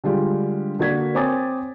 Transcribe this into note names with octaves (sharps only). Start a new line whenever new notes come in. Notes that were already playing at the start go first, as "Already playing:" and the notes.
D3 G3 G#3 F4 G4
D3 A#3 F#4 D5 G#6 B6
C4 C#5 G#5 D6 D#6 A6